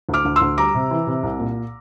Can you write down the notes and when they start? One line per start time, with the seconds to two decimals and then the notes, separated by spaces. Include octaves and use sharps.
0.09 D2
0.14 D6 F6
0.25 D2
0.36 C6 E6
0.41 D2
0.58 G3 A#5 D6
0.74 C3
0.91 E3
1.07 C3
1.23 C2
1.39 A#2